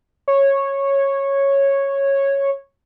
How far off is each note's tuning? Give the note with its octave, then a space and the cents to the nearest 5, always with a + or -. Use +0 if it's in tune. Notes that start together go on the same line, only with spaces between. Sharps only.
C#5 -10